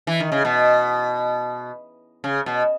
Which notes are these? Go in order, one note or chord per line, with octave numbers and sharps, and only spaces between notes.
E3
D#3
C#3
B2
C#3
B2